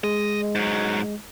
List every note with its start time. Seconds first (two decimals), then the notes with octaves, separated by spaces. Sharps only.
0.04 G#3 D#5
0.55 G#2 F#3